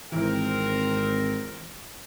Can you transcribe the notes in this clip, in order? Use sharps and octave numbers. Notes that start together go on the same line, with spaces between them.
G#1 E3 C4 A#4